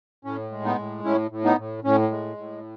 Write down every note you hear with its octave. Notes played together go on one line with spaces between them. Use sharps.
A2 C#4
G#3
B3 D#4
A2
A2 C#4 E4
A2
B3 D#4
A2
A2 C#4
G#3
A2